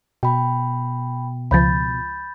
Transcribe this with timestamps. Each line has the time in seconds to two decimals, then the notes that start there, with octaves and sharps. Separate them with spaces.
0.23 B2 G5 B5
1.51 C#2 F3 B5 G6 A6